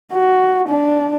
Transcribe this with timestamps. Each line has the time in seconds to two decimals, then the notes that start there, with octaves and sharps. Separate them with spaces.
0.12 F#4
0.68 D4